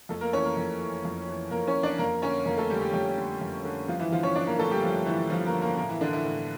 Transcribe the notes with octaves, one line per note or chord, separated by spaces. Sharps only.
F2 A3 A4
A#3 A#4
E3 C#4 C#5
A#3 A#4
F2
E3
F2
E3
F2 A#3 A#4
C#4 C#5
E3
D4 D5
F2 A#3 A#4
D3 C#4 C#5
F2 A#3 A#4
A3 A4
D3 G3 G4
G3 G4
F2 G3 G4
D3
F2
D3
G2 F3 F4
E3 E4
D3 F3 F4
C#4 C#5
G2 D4 D5
A#3 A#4
D3 A3 A4
G3 G4
G2 F3 F4
D3 E3 E4
G2 F3 F4
A#3 A#4
D3
A#3 A#4
A2 A#3 A#4
E3 E4
D3 E3 D4
E3 E4
A2